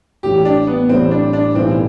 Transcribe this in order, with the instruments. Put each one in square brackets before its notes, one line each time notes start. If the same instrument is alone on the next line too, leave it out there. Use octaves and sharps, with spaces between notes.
[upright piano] A1 A2 G3 [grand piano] G4
[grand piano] D4
B3
[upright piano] A1 A2 G3 [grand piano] C4
[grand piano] D4
D4
[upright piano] B1 A2 E3 G3 [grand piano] C4